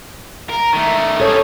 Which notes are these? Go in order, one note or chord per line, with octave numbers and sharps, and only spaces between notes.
A#4
D#3 A3
G3 G#4 A4 C#5